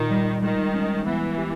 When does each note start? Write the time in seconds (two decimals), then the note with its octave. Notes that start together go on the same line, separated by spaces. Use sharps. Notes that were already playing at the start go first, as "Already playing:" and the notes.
Already playing: A#2 D#3
0.10 G3
0.42 D#3 G#3
0.73 C#4
1.05 E3 B3
1.38 G4